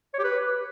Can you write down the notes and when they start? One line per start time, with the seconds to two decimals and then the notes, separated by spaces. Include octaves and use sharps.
0.14 C#5
0.19 G4
0.24 B4